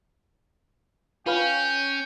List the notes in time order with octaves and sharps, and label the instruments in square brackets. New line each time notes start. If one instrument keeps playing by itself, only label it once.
[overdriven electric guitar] C#4 [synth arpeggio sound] F4 B4 F5 [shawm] G5